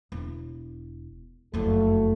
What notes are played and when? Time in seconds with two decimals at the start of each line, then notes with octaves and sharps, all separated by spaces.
0.12 E1
1.54 F#1 F2 F#3 A3